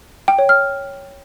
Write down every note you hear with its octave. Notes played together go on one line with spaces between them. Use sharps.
G5
C#5
F6